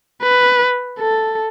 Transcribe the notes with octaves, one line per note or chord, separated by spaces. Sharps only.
B4
A4